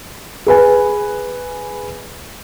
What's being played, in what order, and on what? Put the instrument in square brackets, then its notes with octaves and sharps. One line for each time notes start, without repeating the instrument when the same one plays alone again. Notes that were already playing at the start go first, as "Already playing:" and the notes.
[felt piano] G#4 B4 G#5